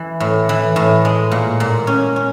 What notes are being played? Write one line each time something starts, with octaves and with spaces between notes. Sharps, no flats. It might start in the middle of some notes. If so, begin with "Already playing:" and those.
Already playing: E3
A2
E3
A2
G#3
A#2
A#2
C#4
C#4